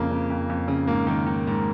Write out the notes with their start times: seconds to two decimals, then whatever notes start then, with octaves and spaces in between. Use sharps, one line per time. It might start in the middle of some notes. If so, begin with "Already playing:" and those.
Already playing: F2 C#3 A#3
0.10 C#3
0.30 F2
0.50 F2
0.68 C#3
0.87 G#2 A#3
1.07 D#3
1.27 D#3
1.47 G#2